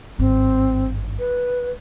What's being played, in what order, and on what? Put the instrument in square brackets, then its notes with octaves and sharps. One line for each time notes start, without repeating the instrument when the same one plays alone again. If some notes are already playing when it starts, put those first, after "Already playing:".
[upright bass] G#1 G2 [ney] C4
[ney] B4